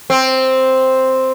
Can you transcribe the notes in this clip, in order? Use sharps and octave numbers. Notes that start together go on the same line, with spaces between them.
C4